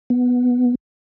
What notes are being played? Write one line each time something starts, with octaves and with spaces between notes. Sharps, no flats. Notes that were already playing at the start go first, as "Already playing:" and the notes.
B3